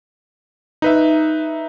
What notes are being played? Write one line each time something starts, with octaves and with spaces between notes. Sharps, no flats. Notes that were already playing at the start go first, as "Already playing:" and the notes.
D#4 B4 E5